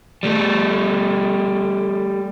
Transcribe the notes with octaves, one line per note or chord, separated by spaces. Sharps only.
G3 A3